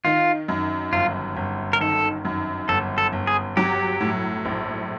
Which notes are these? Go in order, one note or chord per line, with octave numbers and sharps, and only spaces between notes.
D#3 F4
F#2
G1 F4
G1
A#4
D#3 A4
F#2
G1 A4
A4
G1
G#4
F#3 G4
A2
A#1